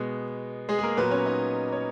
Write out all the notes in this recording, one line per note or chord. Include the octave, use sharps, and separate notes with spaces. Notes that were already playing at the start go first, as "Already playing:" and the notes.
Already playing: B2 G#3 B3
G#3 G#4
G#4
A#3 A#4
A#2 F#3 A#3 B3 B4
C#4 C#5
D#4 D#5
C#5